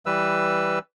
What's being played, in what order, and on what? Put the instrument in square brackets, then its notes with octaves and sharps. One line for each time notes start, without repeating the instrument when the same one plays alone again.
[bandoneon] E3 G3 B4 E6